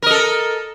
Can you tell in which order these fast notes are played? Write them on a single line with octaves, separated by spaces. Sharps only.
A#4 D#5 A4